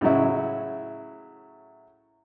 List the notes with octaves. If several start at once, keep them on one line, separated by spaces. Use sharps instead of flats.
A2 C#3 F#3 E4